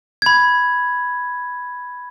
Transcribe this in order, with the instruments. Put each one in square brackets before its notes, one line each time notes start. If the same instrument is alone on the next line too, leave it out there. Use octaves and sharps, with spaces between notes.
[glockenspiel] B5 G#6